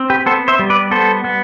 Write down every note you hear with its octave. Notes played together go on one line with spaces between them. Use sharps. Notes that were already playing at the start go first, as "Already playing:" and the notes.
Already playing: C4
G4 B4
B3 A4 C5
C5 E5
G3
B4 D5
B3 A4 C5
B3